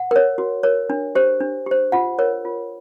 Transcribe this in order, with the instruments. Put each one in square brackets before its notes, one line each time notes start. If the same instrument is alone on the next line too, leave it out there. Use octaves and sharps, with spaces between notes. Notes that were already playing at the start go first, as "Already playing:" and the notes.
Already playing: [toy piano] F#5
A#4 C#5
F#4
A#4 C#5
D4
G4 C5
D4
G4 C5
F4 F#5
A#4 C#5
F4